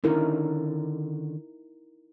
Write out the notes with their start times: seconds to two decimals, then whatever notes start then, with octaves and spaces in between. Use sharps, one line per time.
0.04 D3 D#3 C#4 D#4 E4 A#4